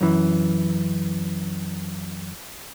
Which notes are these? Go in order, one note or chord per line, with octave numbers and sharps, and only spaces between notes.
F#2 E3